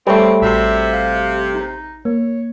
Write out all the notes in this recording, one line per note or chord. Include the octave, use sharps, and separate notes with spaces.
G3 A3 C4 A4 B4 C#5
A1 C3 F#4 E5 C6
F5
D#4
A#3 C#5